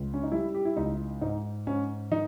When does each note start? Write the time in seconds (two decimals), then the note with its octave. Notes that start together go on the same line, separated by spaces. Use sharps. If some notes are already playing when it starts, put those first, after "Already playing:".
Already playing: C#2
0.14 C#4
0.23 D#4
0.32 G3 E4
0.55 G4
0.65 E4
0.77 C#2 D#4
1.21 G#2 D#4
1.67 G#2 C#4
2.11 D#3 D#4